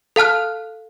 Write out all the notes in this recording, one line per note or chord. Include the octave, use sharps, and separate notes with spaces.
A4 F5 A5 F6 F#6